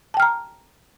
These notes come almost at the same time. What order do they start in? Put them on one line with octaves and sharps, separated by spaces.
A5 G5 F6 A#5